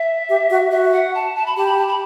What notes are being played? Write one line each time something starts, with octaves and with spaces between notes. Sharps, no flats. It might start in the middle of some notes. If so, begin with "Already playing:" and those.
Already playing: E5
G4
F#4
F#4 E5
F#5
A5
A5
B5
G4 A5
B5
A5
B5